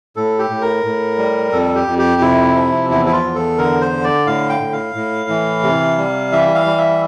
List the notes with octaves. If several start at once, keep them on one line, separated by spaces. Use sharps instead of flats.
A2 A4
G4
A2
A#4
A2
G3
F2 A4
G4
F2
G4
C3 E4
F3
E2 E4
E4
F4
E2
A4
D3 A#4
C5
D3
D5
A2 F5
G5
A2
F5
A2
E3
C3
G3
E3 E5
F5
G3
E5